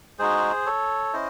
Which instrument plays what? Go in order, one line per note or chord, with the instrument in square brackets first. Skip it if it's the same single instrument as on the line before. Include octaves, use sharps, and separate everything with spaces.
[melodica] G#3 D#4 F#4 G#4 C5
A4 C#5
C#4 E4 C5 D#5